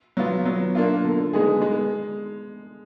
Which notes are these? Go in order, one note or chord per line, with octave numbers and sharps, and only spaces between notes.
F#3 B3 F4
F#3
A#3 D4 F4
D3
G#3 B3 D#4 G#4
G#3